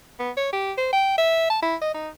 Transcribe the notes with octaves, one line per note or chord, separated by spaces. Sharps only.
B3
C#5
G4
C5
G5
E5
A5
E4
D#5
D#4